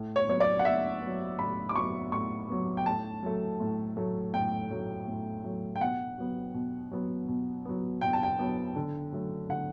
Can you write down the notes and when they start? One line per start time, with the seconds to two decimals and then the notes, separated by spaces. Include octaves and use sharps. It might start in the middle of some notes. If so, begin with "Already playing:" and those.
Already playing: A2
0.16 C#5
0.28 F#3 B3 C#5
0.40 D5
0.59 F#5
0.65 A2 E5
1.02 F#3 B3
1.39 A2 B5
1.69 D6
1.76 F#3 B3 C#6
2.12 A2 C#6
2.49 F#3 B3
2.77 G5
2.86 A2 A5
3.23 F#3 A3
3.60 A2
3.97 F#3 A3
4.34 A2 G5
4.71 F#3 A3
5.07 A2
5.44 F#3 A3
5.76 G5
5.80 B2 F#5
6.18 F#3 B3
6.54 B2
6.91 F#3 B3
7.28 B2
7.65 F#3 B3
8.01 B2 G5
8.13 A5
8.23 G5
8.39 F#3 B3
8.76 D3
9.12 F#3 A3
9.49 D3 F#5